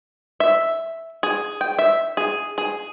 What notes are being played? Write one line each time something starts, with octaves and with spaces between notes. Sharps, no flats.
E5
G#4
G5
E5
G#4
G#4